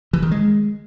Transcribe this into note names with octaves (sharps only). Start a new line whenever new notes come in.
E3
D#3
G#3